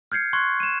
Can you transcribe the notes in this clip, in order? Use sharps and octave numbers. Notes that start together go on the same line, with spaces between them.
F6 G6 G#6 C7 C#7
C6 C#6 F#6 G#6
D#7 E7